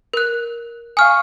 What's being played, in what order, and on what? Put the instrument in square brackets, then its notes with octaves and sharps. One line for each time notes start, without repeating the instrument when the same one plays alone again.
[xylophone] A#4 F#6
[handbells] F5 C#6 D#6 [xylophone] G#5 F6